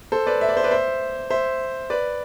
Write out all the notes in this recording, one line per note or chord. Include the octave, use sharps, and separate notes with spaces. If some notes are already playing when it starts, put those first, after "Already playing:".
A4 C5
B4 D5
E5
D5
C5
B4 D5
C5 E5
C5 E5
B4 D5